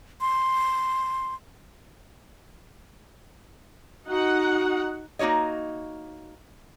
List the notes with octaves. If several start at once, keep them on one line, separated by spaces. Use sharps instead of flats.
C6
D#4 F#4 F#5
A#3 D#4 F#4 C#5 D#5